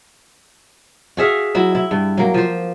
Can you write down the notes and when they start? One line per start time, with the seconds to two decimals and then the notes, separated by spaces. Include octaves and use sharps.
1.17 F#4 G#4 E5 F5
1.55 F#3 E4
1.75 E4
1.91 G2
2.17 F#3 A#3
2.34 F3 C5